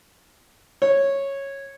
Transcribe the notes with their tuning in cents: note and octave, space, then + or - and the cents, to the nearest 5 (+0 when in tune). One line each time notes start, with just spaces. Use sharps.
C#5 -10